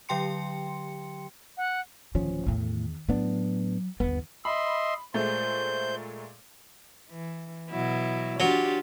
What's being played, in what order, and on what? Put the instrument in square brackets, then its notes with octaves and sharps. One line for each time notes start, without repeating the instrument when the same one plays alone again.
[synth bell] D3 F#3 G4 G5 C6 C#7
[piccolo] F#5
[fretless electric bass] D1 F3 C#4 [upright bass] D#3
[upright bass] E2 D#3 [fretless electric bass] A2
[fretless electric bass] A2 B3 D4 [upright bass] F#3
[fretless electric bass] G1 B3 [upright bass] D#2 D#3
[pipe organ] D#5 E5 C6 [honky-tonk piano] B5
[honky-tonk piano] A#2 G#3 A3 [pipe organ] C5 G6
[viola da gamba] E3
B2 F#3 E4
[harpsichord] F#3 [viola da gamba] D4 F4 G4